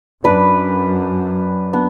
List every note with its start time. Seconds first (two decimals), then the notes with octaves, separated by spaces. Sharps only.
0.24 F#2 D4 B4 D5
1.73 B3 D4